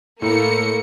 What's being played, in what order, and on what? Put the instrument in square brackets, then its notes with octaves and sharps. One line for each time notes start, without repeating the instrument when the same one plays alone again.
[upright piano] A2 [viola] A3 [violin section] A#3 C#7